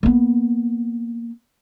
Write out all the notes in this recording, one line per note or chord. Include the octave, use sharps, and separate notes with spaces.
A#3 B3